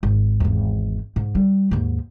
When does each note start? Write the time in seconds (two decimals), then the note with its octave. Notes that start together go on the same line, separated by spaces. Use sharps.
0.03 G#1
0.40 G#1 E2
1.16 G#2
1.35 G3
1.71 D#2 G#2